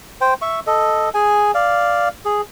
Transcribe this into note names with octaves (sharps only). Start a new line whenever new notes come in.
C5 G5
E5 C#6
A4 D#5
G#4 G#5
D5 F5
G#4